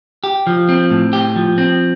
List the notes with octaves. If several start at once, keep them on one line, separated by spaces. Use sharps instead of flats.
G4
F3
C4
A2
G4
F3
C4